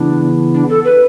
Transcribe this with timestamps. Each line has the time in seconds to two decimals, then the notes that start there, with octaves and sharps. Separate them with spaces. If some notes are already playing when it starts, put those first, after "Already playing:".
Already playing: C#3 E3 B3 D4 E4
0.54 D4
0.69 A4
0.85 B4